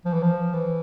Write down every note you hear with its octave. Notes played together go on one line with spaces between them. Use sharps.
F3
E3
F3
E3